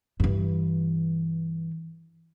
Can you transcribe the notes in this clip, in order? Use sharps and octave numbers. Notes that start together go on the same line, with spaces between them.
G2 E3